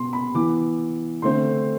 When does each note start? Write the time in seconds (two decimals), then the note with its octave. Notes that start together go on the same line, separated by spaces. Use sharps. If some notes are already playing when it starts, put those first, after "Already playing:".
Already playing: B2 B3 C6
0.13 B5
0.34 E3 B3 D6
1.22 D3 A3 C4 C6